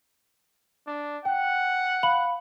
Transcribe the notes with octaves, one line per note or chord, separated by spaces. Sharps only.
D4
F#5 G5
F5 B5 F#7